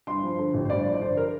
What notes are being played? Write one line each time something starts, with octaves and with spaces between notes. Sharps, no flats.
G2 C6
F3
D3
A1
C5
G2 D5
F3
D5
D3 C5
A#4